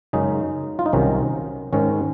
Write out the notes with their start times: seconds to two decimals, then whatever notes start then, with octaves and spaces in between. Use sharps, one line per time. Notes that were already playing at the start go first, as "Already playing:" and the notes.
0.13 F#2 C#3 G#3 C#4 D#4
0.79 F4
0.86 D#4
0.93 C2 C3 D#3 F#3 C#4
1.73 G#2 D#3 G#3 C#4